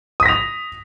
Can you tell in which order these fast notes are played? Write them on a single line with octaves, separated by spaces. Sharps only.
D#6 B6 A#6 F7